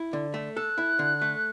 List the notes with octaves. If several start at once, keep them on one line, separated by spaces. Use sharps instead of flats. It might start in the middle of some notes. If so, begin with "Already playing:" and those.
Already playing: E4
D3
A3
A4 F#6
E4
D3
A3